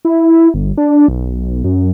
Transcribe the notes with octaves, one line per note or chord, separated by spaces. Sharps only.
E4
G1
D4
B1
F#2